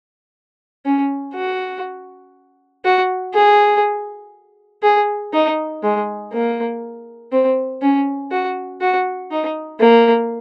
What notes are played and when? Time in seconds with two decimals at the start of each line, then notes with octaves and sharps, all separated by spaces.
0.86 C#4
1.35 F#4
2.84 F#4
3.34 G#4
4.83 G#4
5.33 D#4
5.83 G#3
6.33 A#3
7.32 C4
7.82 C#4
8.31 F#4
8.81 F#4
9.31 D#4
9.80 A#3